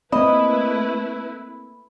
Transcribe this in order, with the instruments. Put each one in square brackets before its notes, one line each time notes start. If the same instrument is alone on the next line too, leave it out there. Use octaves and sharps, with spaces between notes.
[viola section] A3 E4 B4 [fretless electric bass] A#3 C4 [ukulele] D#5 [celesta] B5